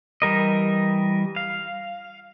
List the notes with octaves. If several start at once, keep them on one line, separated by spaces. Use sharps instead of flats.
E3 G3 A#4 D#5
F5